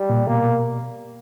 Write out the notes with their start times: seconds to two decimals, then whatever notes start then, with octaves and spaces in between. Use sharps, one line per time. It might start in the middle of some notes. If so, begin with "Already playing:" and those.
Already playing: G3
0.10 A#2
0.27 B2 A#3